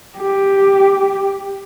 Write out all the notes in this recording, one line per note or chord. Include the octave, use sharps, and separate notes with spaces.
G4